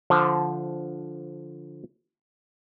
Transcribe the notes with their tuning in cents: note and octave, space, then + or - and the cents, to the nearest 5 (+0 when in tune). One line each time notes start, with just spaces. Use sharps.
D3 -10 F3 +0 C5 +5